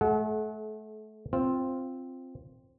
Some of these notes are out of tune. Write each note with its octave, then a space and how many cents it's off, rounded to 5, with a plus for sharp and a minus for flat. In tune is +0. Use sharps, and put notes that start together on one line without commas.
A3 -30 A4 -45 F#5 +0
C4 +5 F4 +0